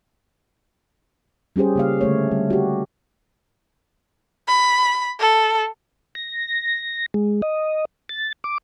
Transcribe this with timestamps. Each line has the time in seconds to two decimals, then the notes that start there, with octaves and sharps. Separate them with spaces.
1.56 G3 C#4 G4 G#4 C5
1.76 C#3 A#3 F5
2.01 D3 A3 C#5
2.31 G3
2.50 F#4 G4
4.48 B5
5.20 A4
6.15 A#6
7.14 G#3
7.42 D#5
8.09 A6
8.44 D6